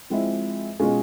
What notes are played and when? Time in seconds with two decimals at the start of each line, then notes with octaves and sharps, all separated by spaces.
0.10 F3 G#3 C4 E4
0.80 B2 G#3 C#4 F4 G#4